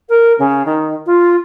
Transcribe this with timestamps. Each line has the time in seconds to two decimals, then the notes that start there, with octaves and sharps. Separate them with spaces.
0.09 A#4
0.38 C#3
0.65 D#3
1.06 F4